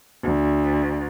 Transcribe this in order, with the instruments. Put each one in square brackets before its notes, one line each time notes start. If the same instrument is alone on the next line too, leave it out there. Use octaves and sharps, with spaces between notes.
[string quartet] D2